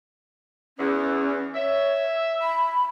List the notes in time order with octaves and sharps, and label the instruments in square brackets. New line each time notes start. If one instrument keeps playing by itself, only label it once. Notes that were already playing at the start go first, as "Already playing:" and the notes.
[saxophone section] E2 [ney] C#4
[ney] C#5 [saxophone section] E5
[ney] B5